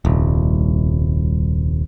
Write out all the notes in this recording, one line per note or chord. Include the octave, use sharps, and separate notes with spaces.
D#1 C2